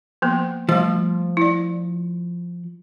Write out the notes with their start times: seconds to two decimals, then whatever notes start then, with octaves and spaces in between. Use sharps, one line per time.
0.22 F3 A#3 B3
0.69 F3 G3 A3
1.37 E4 D5